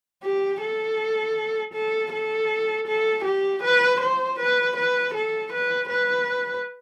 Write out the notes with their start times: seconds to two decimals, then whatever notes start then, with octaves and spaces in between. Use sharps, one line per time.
0.23 G4
0.61 A4
1.73 A4
2.12 A4
2.87 A4
3.24 G4
3.63 B4
4.00 C5
4.39 B4
4.76 B4
5.14 A4
5.52 B4
5.90 B4